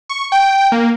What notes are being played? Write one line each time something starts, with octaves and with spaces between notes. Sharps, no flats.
C#6
G5
A#3